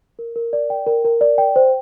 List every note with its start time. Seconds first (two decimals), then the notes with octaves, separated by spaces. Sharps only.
0.19 A#4
0.36 A#4
0.53 D5
0.70 G5
0.87 A#4
1.05 A#4
1.21 D5
1.38 G5
1.56 C5